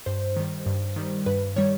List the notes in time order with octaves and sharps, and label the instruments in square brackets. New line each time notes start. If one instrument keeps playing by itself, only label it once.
[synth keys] G2 C5
D#3 G3
G2
D#3 G3
G2 B4
D#3 G3 C#5